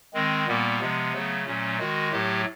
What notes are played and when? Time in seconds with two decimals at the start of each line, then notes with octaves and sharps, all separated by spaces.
0.14 D#3 G#3 C4
0.47 A#2 G3 A#3 B3
0.80 C3 F3 G#3
1.13 C#3 F#3 A3
1.46 A#2 F#3 A3 C#4
1.79 D#3 G#3 F#4
2.12 A2 F#3 A3 G4